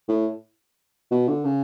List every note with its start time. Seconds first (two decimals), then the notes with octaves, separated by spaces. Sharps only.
0.09 A2
1.11 B2
1.29 D3
1.45 C#3